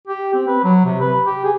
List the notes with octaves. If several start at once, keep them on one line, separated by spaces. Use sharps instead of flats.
G4
C4
B4
F#3
C3
B4
G4
G#4